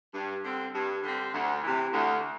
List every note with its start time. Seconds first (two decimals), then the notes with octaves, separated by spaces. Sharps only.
0.14 G2
0.44 D3 G3 C4
0.74 G2
1.03 D3 G3 C4
1.34 D2
1.63 C3 E3
1.93 D2